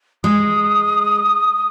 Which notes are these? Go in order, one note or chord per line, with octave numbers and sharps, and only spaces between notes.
G#3 D#6